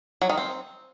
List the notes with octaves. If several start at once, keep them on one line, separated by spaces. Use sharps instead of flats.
F#3
D#3
C4